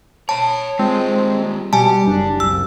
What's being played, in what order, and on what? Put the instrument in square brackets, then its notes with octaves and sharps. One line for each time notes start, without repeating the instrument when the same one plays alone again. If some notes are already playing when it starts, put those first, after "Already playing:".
[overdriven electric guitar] C#5 B5 [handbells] A5
[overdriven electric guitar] G3 F4 [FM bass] G#3 [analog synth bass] C4
[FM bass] B2 [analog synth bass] G3 [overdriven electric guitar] G4 [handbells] G#5 A5
[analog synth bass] F#1 [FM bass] D4
[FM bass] C2 [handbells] E6